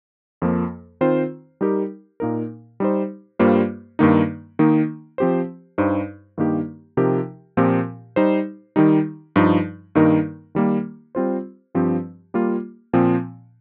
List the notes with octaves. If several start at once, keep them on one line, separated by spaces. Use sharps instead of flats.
F2 F3 A#3
D#3 C4 F4 C5
G3 D#4 G4 A#4
A#2 A#3 D#4 A#4
G3 D#4 C5
G2 G3 A#3 F4 C5
G2 D#3 A#3 D#4
D#3 A#3 D#4
F3 C4 G4 C5
G2 G3 D#4 C5
G2 D#3 A#3 D#4 G4
C3 F3 D#4 G4 A#4
A#2 F3 C4 G4 A#4
G3 D#4 C5
D#3 G3 D#4
G2 F3 D#4
G2 D#3 A#3 D#4 A#4
D#3 G3 A#3
G3 C4 F4 C5
G2 F3 C4 G4
G3 A#3 F4
A#2 F3 C4